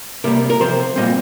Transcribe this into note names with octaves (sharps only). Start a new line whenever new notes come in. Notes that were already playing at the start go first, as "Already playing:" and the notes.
C3 G3 A#3 A#4
A#4
C3 F3 C4 C5
A#2 G3 C4 D#5